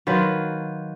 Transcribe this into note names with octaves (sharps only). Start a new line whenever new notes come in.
D#3 F#3 F4 B4